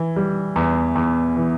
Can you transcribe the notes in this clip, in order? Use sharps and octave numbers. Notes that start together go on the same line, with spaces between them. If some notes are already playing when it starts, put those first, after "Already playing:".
Already playing: E3
G3
E2
E2
E3